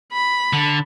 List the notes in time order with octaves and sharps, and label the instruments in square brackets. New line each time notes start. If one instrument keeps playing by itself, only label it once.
[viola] B5
[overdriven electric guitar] D3